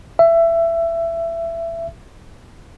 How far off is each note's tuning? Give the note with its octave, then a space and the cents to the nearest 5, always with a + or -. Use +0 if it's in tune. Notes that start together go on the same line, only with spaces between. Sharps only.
E5 +20